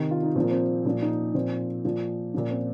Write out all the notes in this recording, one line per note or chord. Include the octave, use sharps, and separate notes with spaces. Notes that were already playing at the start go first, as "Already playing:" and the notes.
Already playing: C3 D#3
F4
D#4
A#2 F3 C4
A#3
C4
A#2 F3 C#4
D#4
A#2 F3 C4
A#2 F3
A#2 F3 C#4
C4